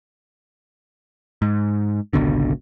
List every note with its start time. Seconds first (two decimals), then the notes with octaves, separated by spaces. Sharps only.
1.42 G#2
2.13 G#1 C#2 B2 D3